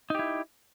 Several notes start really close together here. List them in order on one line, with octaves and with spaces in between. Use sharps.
D#4 G4 E4